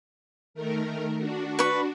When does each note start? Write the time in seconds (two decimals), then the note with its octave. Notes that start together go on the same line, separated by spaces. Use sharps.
0.54 D#3 A3 A#4
1.18 D4 F#4
1.59 B4 C#6